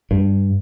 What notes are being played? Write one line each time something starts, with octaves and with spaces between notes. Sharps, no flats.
G2